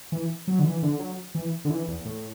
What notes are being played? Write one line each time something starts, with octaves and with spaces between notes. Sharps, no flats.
E3
F#3
D3
E3
D3
F#3
E3
D3
E3
E2
A2